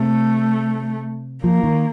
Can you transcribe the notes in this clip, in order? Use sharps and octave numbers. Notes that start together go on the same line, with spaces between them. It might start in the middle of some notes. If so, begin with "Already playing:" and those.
Already playing: C3 A3
F3 A#3
D#3